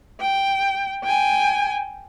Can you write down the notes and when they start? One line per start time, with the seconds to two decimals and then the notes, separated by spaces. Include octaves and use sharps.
0.21 G5
1.04 G5 G#5